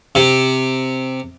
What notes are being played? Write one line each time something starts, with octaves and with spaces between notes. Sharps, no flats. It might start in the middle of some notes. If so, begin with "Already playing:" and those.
C3